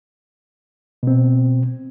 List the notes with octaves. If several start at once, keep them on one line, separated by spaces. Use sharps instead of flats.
B2 C4